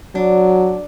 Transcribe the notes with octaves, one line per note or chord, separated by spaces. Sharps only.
F#3 D4